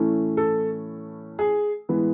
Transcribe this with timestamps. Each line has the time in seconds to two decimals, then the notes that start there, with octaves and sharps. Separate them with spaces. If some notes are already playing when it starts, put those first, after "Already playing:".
Already playing: A2 E3 A3 C#4
0.37 A4
1.39 G#4
1.89 A2 E3 G#3 B3